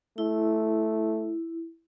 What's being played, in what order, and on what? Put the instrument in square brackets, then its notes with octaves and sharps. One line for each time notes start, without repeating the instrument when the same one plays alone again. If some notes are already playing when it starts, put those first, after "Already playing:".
[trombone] A3 [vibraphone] E4